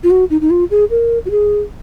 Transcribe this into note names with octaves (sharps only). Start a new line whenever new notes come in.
F4
F#4
D#4
D#4
F4
G#4
A#4
F#4
G#4